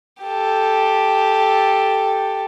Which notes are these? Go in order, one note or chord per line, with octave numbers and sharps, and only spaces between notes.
G4 A4